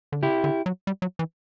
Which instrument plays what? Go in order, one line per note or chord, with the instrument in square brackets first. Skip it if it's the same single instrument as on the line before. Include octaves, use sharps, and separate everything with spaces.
[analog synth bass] D3
[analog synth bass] C#3 [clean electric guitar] E4 G4
[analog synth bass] D3
F#3
G3
F#3
E3